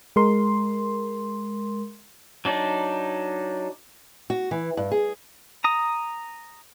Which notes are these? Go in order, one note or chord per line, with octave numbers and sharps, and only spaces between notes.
G#3 A#4 C6
F#3 D4 D#4
F#4
E3
G2
G#4
A#5 D#6